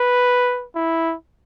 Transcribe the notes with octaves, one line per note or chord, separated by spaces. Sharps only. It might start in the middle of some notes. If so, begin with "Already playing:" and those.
Already playing: B4
E4